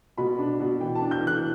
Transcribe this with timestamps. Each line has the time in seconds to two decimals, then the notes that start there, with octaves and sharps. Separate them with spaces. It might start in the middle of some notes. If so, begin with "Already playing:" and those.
0.18 B2 B5
0.38 D4
0.60 B2
0.80 E3 G5
0.95 A5
1.01 D4
1.11 G6
1.22 E3
1.27 F#6